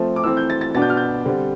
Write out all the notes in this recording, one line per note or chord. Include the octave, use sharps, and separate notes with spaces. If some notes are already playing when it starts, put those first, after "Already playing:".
Already playing: F3 A3 C4
D6
E3 A3 C4 E6
G6
A6
A6
B2 B3 D4 A6
G6
F6
G6
D3 G3 C4